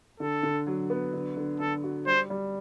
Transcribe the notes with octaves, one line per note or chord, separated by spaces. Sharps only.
D3 A4
D3
F#3
B3
D3
D3
D3 A4
F#4
G3 C5
G3